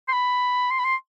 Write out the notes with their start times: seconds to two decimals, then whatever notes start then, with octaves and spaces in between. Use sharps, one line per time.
0.08 C6
0.13 B5
0.71 C6
0.79 B5
0.84 C6